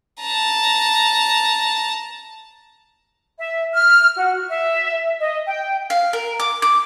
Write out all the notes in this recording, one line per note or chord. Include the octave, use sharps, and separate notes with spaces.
A5 A#5
E5
F6
F#4
E5
D#5
G5
F5
A#4
D6
D6